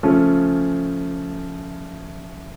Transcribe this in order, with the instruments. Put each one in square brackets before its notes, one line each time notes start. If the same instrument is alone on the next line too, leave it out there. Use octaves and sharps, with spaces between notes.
[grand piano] C#3 F3 A3 C#4